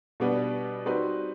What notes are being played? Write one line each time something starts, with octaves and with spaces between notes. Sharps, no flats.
B2 G3 B3 D4
G3 C4 D#4 F#4 B4